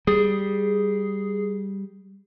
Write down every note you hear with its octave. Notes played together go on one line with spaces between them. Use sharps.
G3 G#4